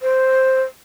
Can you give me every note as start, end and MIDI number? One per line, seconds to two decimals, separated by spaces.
0.01 0.63 72